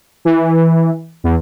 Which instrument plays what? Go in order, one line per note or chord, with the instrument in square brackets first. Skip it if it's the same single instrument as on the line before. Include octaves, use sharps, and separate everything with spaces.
[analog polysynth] E3
E2